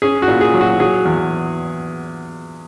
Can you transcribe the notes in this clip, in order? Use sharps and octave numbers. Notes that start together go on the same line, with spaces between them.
C#4 G#4
F#4
A#2
G#4
F#3
F#4
F#3 G#4
E2